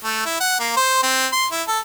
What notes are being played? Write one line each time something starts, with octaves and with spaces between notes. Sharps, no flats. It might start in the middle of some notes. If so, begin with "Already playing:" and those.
A3
E4
F#5
A#3
C5
C4
C6
E4
A4